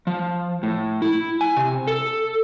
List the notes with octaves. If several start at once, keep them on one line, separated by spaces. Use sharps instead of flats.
F3
A2
E4
G#5
C3
A4